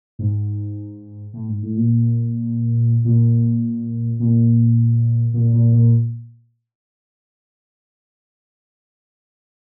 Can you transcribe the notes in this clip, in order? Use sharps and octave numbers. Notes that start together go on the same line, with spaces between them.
G#2
A2
G#2
A2
A#2
A#2
A#2
A#2
A#2
A#2